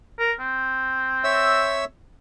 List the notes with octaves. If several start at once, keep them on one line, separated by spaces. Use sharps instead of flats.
A#4
C4
C#5 E5 E6